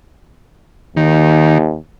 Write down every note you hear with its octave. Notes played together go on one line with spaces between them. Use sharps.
D#2 D#3